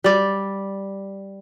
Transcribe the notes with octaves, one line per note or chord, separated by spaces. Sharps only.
G3 D5